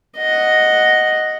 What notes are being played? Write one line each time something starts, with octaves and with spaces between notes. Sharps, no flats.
D#5 F#5